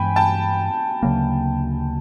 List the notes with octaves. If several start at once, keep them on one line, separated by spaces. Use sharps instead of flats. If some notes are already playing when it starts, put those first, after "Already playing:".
Already playing: G2 E3 G#3 B3 G5 G#5 B5
G5 A5
D2 C#3 F#3 A#3